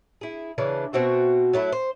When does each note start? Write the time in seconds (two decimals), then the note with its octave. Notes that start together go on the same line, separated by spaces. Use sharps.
0.21 E4 G#4
0.58 C#3 E3 D4
0.93 B2 C4 F#4 E5
1.53 F#3 A3 D#4 E4
1.72 C5